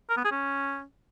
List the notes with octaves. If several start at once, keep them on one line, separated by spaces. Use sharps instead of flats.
A#4
B3
G#4
C#4